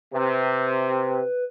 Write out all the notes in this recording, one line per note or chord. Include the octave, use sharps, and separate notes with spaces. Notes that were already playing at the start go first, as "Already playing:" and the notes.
C3 B4